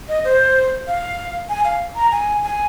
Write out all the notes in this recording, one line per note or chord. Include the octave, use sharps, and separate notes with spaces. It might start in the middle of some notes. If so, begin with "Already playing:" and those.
D#5
C5
F5
G#5
F5
A#5
G#5
G#5